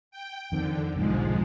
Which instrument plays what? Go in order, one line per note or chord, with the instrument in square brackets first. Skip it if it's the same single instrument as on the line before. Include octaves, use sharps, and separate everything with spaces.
[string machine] G5
[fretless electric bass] F2 D#3 C4 [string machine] D3
[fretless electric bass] F1 B1 [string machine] G#2 F3 G#3